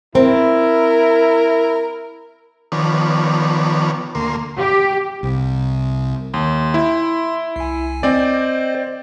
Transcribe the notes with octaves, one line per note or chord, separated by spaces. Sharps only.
C4 E4 A#4
D#3 F3 B3 C#5 D5
D2 A#3 C6
G4
C2
D#2 C6
E4
C2 G#5
C4 C5 D5 D#5